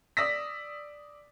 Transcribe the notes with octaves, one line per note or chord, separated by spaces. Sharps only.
D5 D#6 E6 A#6 B6